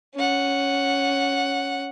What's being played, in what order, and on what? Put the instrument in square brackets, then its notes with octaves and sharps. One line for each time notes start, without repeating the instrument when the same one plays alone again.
[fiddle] C#4 F#5